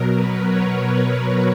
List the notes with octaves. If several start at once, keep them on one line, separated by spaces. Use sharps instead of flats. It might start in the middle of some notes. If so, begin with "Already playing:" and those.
Already playing: B2 F#3 A#4
B4
C#5